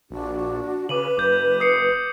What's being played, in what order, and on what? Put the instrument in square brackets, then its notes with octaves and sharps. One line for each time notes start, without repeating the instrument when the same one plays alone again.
[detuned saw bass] A#1 [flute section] D4 F#4
[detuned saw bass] C#3 [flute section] B4 [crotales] D6 D#7 F#7
[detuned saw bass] F#1 [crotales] D6 G6
[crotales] D#6 C7 C#7